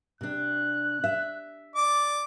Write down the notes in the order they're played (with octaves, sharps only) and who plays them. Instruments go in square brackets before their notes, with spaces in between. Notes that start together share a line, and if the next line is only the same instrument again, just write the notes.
[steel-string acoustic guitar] C3 D4 [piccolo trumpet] F#6
[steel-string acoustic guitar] E5
[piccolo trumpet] D5 [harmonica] D6